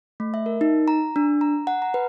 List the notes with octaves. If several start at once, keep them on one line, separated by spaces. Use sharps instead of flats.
A3
E5
A#4
D#4
A#5
D4
A#5
F#5
A#5
B4